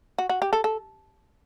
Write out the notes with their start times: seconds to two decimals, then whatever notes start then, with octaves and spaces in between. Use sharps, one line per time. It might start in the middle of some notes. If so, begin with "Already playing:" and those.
0.18 F#4
0.29 F#4
0.42 G4
0.53 A4
0.64 A4